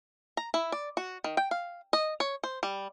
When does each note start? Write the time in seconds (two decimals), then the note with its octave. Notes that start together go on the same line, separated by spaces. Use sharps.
0.37 A#5
0.54 E4
0.72 D5
0.97 F#4
1.24 D#3
1.37 G5
1.51 F5
1.93 D#5
2.20 C#5
2.44 C5
2.63 G3